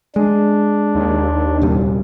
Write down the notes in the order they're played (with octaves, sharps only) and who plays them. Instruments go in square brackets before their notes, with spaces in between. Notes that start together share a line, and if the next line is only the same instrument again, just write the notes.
[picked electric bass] G#3 [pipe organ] D4
[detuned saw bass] D#2
[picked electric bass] D#1 C2 G3